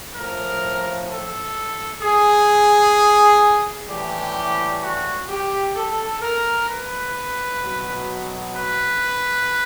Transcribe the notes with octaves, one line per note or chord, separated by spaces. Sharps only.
A2 F3 A#4
A4
G#4
A2 E3 G3 G4
F#4
G4
A4
A#4
B4
B2 F#3
B4